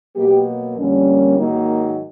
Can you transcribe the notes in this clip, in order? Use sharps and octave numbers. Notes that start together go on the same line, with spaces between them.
B2 F#3 A#3 G4
F2 D3 G3 A#3 C#4
G#2 D#3 F#3 A#3 D#4